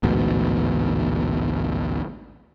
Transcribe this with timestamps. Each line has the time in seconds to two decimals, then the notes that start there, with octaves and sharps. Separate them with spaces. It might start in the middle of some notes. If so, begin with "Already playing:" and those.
0.03 A1 D2 G#2 B2